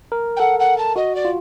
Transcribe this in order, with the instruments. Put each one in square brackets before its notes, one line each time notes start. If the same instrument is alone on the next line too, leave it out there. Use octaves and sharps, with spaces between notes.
[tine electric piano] A#4
[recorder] G5
[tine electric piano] A4 [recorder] F#5
[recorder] F#5
A5
[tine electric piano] F#4 [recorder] D#5
[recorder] D5
[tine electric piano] F4